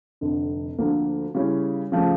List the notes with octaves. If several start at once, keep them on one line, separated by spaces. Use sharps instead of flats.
F1 F2 D3
D2 D3 F3 A#3
C#3 G3 C#4 E4
C#3 F3 A3